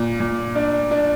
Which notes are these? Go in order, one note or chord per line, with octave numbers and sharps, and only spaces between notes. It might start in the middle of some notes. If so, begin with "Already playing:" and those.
Already playing: A#2
A#2
D4
D4